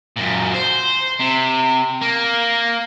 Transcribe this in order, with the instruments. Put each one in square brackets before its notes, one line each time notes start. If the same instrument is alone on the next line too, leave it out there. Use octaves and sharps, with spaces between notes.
[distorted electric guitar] F#2 A#2
C5
C3
A#3